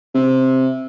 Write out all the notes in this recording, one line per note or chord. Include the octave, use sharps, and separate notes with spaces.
C3